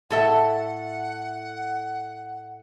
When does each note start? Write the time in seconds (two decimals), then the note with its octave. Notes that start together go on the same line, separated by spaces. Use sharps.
0.10 A2 A4 E5 F#5